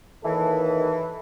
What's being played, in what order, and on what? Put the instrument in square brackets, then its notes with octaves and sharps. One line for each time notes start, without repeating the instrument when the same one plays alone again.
[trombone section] D#2 D#4 A4 [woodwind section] E3